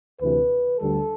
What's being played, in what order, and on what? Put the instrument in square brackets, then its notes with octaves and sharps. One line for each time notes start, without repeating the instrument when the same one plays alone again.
[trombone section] D2 C3 E3 B4
D2 D3 G3 A4